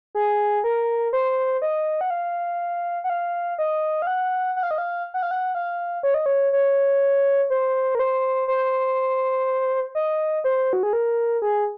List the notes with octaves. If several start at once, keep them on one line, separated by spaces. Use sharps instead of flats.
G#4
A#4
C5
D#5
F#5
F5
F#5
F5
D#5
F5
F#5
F#5
F5
D#5
F5
F#5
F5
F#5
F5
C#5
D#5
C#5
C#5
C5
A#4
C5
C5
D#5
C5
F#4
G#4
A#4
G#4